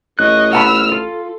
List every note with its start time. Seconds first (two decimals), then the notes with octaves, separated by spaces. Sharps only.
0.19 A1 D#5 C#6 F#6
0.53 F#5 A5 B5 E6 F6
0.92 F4 A4